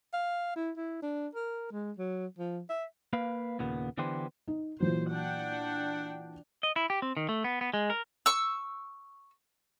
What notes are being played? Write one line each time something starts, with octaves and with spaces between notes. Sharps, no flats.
F5
E4
E4
D4
A#4
G#3
F#3
F3
E5
A#3 B4 F5
D#2 A#2 C#3 B3
D3 E3 B3 D4 G4 C5
D#4
A#2 E3 F#3 C5
D4 F#5 G5
D#5
E4
G4
C4
D#3
A3
B3
B3
G#3
A#4
C#6 E6